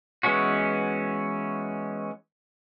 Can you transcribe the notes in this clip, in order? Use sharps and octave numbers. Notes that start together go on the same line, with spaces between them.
E3 G#3 B3 C#4 F#4